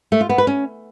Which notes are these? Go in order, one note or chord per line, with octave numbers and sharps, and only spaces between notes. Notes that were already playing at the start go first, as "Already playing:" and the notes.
A3
F4
B3
B4
C#4